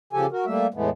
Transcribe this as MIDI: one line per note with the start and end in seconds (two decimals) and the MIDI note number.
0.13 0.26 49
0.13 0.26 53
0.13 0.26 67
0.13 0.26 69
0.13 0.26 80
0.32 0.45 66
0.32 0.45 70
0.46 0.67 55
0.46 0.67 57
0.46 0.67 58
0.46 0.67 76
0.74 0.90 40
0.74 0.90 45
0.74 0.90 52
0.74 0.90 56
0.74 0.90 57
0.74 0.90 59